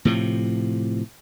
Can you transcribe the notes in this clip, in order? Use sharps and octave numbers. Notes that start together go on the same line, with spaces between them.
A2 C3 F3